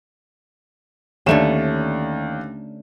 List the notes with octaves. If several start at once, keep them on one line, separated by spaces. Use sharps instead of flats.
D#2 D3 A3 C#4 E7